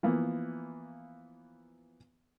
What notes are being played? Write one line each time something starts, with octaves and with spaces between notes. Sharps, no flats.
E3 F3 A#3 B3